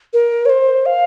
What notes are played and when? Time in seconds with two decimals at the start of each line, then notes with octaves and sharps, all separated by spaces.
0.13 A#4
0.46 C#5
0.49 C5
0.86 F5